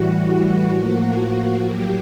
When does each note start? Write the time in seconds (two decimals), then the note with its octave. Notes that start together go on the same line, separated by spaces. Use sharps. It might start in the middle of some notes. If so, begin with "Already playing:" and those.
Already playing: A2 E3 G3 F#4
0.28 F#4
0.74 A2 F3 A#3 F#4
1.20 F#4
1.66 A2 F#3 A#3 G4